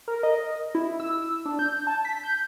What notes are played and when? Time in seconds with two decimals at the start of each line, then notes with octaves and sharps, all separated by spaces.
0.08 A#4
0.23 D#5
0.75 E4
1.00 E6
1.45 D4
1.59 G6
1.87 A5
2.05 B6
2.23 G6